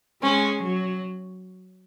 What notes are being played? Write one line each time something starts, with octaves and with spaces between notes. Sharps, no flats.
G#3 C#4
F#3